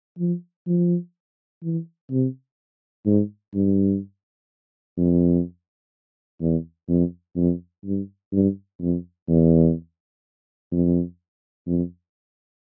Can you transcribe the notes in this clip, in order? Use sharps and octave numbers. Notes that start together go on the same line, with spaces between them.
F3
F3
E3
C3
G#2
G2
F2
E2
F2
F2
G2
G2
F2
E2
F2
F2